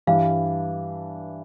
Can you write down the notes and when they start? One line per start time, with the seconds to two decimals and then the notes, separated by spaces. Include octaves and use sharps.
0.07 G2 E3 G3 D4 F5